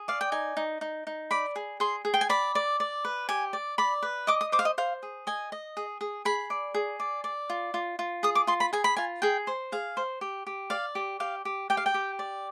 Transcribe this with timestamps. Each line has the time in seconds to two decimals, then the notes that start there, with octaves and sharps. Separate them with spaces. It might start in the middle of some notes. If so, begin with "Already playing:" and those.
Already playing: G#4
0.08 D5 F5
0.21 G5
0.32 D#4 G#5
0.57 D#4
0.81 D#4
1.07 D#4
1.31 D5 B5
1.56 G#4
1.80 G#4 C6
2.05 G#4
2.14 G5
2.21 G#5
2.29 D5 B5
2.55 D5
2.80 D5
3.05 B4
3.29 G4 G#5
3.53 D5
3.78 D5 B5
4.02 B4
4.27 D#5 D6
4.41 D#6
4.52 C5 D6
4.59 F5
4.65 D#5
4.78 C5 F5
5.03 G#4
5.27 D#5 G#5
5.52 D#5
5.77 G#4
6.01 G#4
6.25 G#4 B5
6.50 D5
6.74 G#4
7.00 D5
7.24 D5
7.50 F4
7.74 F4
7.99 F4
8.23 G#4 D#6
8.35 D6
8.47 F4 C6
8.60 B5
8.73 G#4 G#5
8.84 B5
8.97 F4 G#5
9.22 G#4 G5
9.47 C5
9.72 G#4 F5
9.97 C5
10.21 G4
10.47 G4
10.70 D5 F5
10.95 G4
11.20 G4 F5
11.45 G4
11.70 G4 G5
11.77 F5
11.86 G5
11.94 G4
12.19 D5